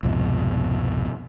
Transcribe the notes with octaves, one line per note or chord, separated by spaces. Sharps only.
C2 F2 G#2 B2